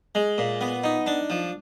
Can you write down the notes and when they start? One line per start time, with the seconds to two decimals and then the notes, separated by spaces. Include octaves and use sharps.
0.15 G#3
0.38 A#2
0.61 B3
0.84 D#4
1.06 D4
1.30 F3